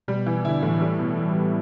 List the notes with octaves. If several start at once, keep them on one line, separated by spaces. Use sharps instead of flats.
B2 G3
B2 E3
D3 E4
A2 E3
G3
B2
G3 E4